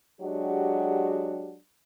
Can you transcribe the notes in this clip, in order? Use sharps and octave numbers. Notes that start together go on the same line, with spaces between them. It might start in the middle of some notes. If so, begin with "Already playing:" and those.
F#3 G#3 D4 F#4 G4